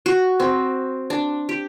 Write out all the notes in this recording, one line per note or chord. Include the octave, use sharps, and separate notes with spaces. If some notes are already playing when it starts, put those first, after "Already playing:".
F#4
C4
D4
G4